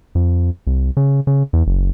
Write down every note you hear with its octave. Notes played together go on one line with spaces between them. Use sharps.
F2
C2
C#3
C#3
E2
F#1